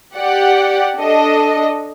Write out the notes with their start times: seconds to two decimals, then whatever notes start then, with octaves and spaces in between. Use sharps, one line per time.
0.15 G4 D5 F#5
0.95 D4 A4 D#5